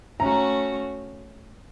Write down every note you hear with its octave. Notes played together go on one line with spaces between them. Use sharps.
A3 C#4 F#4 A#5